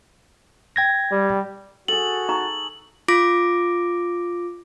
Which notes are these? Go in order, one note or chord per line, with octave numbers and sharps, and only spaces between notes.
G5 G#6 A#6
G3
F#4 G#4 A4 F#7
D#4 A#5 C#6
F4 D6 A#6 D7